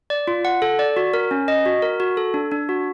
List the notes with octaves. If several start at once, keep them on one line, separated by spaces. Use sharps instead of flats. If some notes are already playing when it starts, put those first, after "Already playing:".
D5
F4
F#5
A4
D5
F#4
A#4
C#4
D#5
F#4
A#4
F#4
A4
D4
D4
F#4